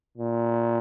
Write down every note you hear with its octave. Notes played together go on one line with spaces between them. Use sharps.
A#2